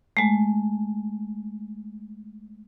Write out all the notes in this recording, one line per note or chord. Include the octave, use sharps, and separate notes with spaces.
G#3 A3